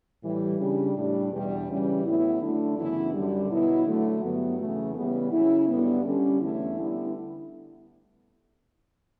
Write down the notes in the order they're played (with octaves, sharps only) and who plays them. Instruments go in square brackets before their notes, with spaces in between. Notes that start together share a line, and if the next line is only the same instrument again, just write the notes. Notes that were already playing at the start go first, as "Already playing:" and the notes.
[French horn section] A2 E3 G3
C#3 G3 D4
A2 G3 D4
E2 B2 G3
C#3 E3 G3 C#4
A2 F#3 B3 E4
D3 A3 D4
F#2 C#3 E3 B3 E4
F#2 D3 G3
B2 F#3 B3 E4
D3 F#3 A3
G2 F#3 B3
E2 C#3 E3 A3
C#3 E3 G3 B3
C#3 F#3 C#4 E4
G2 D3 G3 B3
D3 G3 C#4
E2 D3 A3 C#4 E4
D3 G3 B3 E4